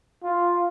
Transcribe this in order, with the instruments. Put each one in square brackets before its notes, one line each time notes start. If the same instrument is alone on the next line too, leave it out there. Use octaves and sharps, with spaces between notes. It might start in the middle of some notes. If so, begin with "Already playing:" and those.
[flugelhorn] F4